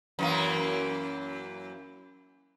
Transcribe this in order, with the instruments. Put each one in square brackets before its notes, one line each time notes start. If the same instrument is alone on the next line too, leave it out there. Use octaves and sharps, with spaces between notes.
[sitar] F#2 E3 A#3